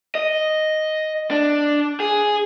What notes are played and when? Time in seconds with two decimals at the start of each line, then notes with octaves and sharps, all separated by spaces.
0.15 D#5
1.31 D4
2.00 G#4